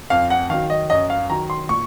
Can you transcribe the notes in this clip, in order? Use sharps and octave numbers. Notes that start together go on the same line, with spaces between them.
F2 F5
F#5
D#3 F#3 F5
D#5
F#2 D#5
F5
D#3 F#3 A#5
C6
A#2 C#6